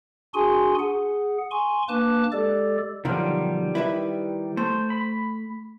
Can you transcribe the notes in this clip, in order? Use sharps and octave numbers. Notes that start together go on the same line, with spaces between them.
D4 F#4 G#4 G#5 C6
G#4 F#5
G#5 C6 C#6
A#3 D4 B4 A5 D6 F#6
G#3 G4 A4 D5
B1 D3 D#3 F3 G3
E4 B4 E5
A3 C5
B5